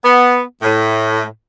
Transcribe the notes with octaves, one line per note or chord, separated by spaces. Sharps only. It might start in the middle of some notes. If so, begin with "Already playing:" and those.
B3
A2